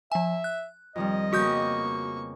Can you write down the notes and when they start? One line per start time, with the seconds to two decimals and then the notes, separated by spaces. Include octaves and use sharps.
0.12 F3 E5 G#5
0.44 F#6
0.96 F2 D#3 G3 D#5
1.33 C#3 A#3 B3 F#4 C#6 D#6 G6